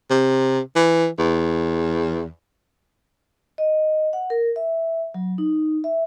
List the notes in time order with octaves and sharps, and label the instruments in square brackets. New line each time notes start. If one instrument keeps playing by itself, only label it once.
[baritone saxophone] C3
E3
E2
[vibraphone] D#5
F#5
A#4
E5
F#3
D#4
E5